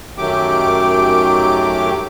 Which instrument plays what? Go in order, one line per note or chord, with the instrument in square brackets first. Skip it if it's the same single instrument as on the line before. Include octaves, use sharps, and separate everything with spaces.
[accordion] F#2 D#3 F#3 A3 G4 D6